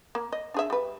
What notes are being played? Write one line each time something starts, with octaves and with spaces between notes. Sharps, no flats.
A#3
D#5
D4 G#4 E5
G3 B4